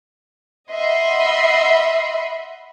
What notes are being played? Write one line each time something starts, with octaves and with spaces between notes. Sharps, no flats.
D#5 E5 F#5 B5 C6